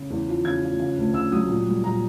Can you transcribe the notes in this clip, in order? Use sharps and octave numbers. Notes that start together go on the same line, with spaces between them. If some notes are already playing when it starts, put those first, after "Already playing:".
Already playing: C#3
E2
F3
C#3 G#6
F3
C#3
D2
C#3 E6
F#3 D#6
A#2
G3
A#2 A#5